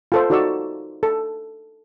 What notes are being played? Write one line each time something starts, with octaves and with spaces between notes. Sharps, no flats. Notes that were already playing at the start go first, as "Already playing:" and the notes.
F4 A4 C5
D#4 F#4 A4 D5 C#6 E6
A4